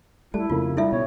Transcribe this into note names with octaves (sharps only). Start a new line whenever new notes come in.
G3 A3 E4 A5
F2 C#3 A#3 F4
G3 E4 A4 E5
B2 C#5